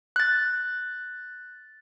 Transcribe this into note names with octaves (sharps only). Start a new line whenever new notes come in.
F#6 A6